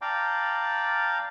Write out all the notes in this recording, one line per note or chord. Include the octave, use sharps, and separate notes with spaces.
D5 F5 G5 A5 A#5 D6